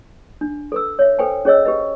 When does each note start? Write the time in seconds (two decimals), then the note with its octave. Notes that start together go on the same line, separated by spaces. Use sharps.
0.41 D4
0.72 A4 B4 E6
0.99 C#5 E5
1.19 A4 B4 C5 G5 G#5
1.45 C#4 G#4 C#5 D#5 E6
1.65 G4 B4 D#5